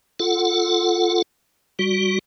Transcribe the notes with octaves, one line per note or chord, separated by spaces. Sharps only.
F4 A4 F#5
G3 F#4